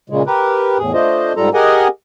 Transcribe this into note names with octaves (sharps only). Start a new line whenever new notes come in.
A#2 C#3 G#3
G4 A#4 B4
E2 A2 G#4
A3 D4 F4 C5 D#5
G#2 G3 F4 A4 A#5
G4 G#4 A#4 D#5 F#5 G#5